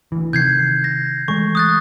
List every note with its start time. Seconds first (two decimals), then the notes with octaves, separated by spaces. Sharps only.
0.12 D2 E3
0.33 C3 D#3 G6 G#6 C7
0.84 A#6
1.28 E3 G#3 A3 C#6
1.55 D#6 F#6 A6